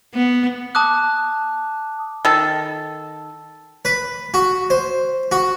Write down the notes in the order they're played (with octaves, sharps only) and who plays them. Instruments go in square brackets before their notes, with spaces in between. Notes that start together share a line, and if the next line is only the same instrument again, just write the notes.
[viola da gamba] B3
[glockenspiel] A5 D6 D#6 F#6
[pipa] D#3 A4
[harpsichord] B4
F#4
C5
F#4